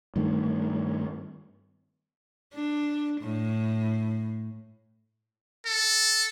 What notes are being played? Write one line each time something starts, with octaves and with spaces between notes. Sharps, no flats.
G2 D#3 A3
D4
A2
A4